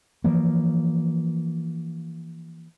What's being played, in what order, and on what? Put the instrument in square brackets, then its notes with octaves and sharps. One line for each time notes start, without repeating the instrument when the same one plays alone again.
[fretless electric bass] E3 F3 A#3